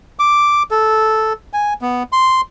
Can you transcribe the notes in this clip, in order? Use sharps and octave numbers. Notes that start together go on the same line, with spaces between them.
D6
A4
G#5
B3
C6